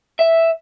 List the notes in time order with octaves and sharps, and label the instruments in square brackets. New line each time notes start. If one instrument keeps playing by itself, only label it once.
[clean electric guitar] E5